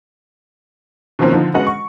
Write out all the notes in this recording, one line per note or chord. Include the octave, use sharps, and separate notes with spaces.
B2 D#3 F3 A#3 C4 C#4
D3 F3 D#4
G#3 B3 C#4 F#4 D#5 F#5
C#6